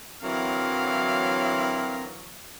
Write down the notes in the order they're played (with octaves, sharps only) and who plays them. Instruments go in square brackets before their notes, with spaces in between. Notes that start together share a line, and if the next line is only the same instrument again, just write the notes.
[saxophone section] D3 E3 F#3 [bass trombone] C4 [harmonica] E4 A#4 [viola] F5